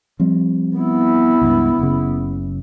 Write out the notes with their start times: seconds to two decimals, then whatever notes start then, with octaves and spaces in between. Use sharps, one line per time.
0.20 F3 G3 C4
0.77 B3 E4
1.42 C#2 G2
1.79 F#1 C#3